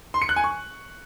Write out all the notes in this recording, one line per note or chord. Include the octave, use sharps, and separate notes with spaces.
C6
C#7
F#6
G#5
C#6